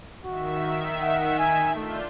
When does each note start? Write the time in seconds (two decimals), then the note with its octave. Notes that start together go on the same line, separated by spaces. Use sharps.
0.25 D#3 F#4 E5
1.02 F#5
1.39 G#5
1.76 A3 D4 F4 G6